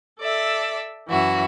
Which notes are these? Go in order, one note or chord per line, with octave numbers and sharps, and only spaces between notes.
A4 D5 E5
F#2 E3 F#4 E5